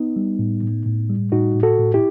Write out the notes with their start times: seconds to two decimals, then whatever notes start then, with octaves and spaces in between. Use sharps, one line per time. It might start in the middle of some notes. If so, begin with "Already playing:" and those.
Already playing: B3 D#4
0.16 G3
0.39 A2
0.63 A2
0.86 A2
1.09 G3
1.32 A2 D#4 F#4
1.55 A2
1.63 F#4 A4
1.79 A2
1.94 E4 G4